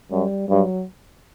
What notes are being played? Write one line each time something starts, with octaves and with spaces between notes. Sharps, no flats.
F#2 G3
G2 F#3